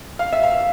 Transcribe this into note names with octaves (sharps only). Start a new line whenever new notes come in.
F5
E5
F5